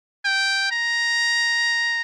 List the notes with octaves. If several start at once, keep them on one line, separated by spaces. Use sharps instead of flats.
G5
A#5